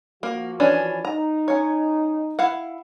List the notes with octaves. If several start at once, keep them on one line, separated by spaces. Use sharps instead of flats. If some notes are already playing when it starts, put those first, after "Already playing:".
F3 A#3 F#4
E3 C#4 D4
D#4 A#5
C#4 C#5
E4 F5 F#5